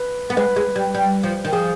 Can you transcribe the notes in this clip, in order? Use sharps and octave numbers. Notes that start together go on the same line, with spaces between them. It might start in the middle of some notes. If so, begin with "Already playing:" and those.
Already playing: B4
B3
G#3 B4
G#3
G3
G3
F3
D#3
F3 G#4